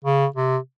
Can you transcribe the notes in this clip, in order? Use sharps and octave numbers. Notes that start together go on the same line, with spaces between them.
C#3
C3